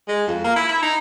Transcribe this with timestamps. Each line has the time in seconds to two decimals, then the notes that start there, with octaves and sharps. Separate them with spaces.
0.08 G#3
0.28 F2
0.44 A#3
0.56 E4
0.69 E4
0.83 D#4